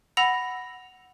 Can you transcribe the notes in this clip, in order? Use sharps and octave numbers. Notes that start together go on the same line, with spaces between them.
F#5 B5 E6 A#6 F7